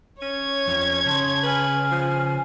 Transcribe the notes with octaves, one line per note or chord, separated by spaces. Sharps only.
C#4 C#5 G#6
F2
C#3 A5 C6
B4 G#5 F6
F3